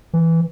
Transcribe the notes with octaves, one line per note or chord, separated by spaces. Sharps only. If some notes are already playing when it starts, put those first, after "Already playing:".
E3